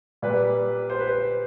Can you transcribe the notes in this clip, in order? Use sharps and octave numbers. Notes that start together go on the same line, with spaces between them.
A#2 G3 B4
C5
B4
C5